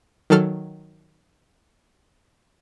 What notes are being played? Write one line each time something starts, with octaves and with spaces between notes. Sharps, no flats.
D#3 F#3 A4 F6